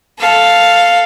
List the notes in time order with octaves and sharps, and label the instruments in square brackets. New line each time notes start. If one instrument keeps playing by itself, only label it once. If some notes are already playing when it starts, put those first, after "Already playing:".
[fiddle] A4 F5